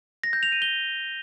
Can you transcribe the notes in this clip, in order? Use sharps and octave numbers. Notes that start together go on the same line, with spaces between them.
A#6
G6
F7
D#7
G7